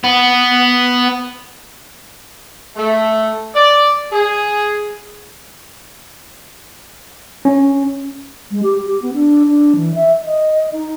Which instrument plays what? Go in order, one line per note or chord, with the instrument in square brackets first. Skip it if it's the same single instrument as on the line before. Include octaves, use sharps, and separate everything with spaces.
[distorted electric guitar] B3
[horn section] A3
D5
G#4
[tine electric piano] C#4
[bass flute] G#3
G4
G4
B3
D4
D4
E3
E5
D#5
D#4